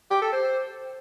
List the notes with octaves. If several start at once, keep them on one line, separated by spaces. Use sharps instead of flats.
G4
A4
C5